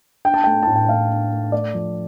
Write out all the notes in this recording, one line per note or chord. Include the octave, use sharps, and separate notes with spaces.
D4 G5
A5
A3 G5
A2 A5
G5
A2 F5
D4
A3
A3 D5
F3